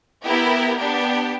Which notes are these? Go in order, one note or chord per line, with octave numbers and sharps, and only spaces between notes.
B3 E4 G4 A#4
B3 D4 G4